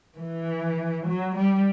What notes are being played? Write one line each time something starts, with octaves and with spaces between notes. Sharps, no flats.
E3
F#3
G3